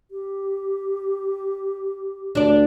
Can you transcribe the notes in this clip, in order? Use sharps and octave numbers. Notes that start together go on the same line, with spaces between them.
G4
D2 D4 D5